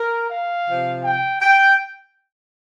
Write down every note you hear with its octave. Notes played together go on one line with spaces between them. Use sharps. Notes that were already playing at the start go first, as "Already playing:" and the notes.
Already playing: A#4
F5
C3 F3
G5
G5